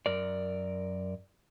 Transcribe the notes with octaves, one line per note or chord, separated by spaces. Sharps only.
F#2 A#4 D5